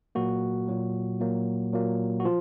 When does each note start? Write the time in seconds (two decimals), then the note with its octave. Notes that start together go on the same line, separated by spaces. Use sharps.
0.15 A#2 F#3 A#3 F#4
0.68 A#2 F#3 A#3
1.20 A#2 F#3 A#3
1.73 A#2 F#3 A#3
2.20 F#4
2.25 F3 F4